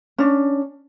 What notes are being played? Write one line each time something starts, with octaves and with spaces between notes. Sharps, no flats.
C#4 D4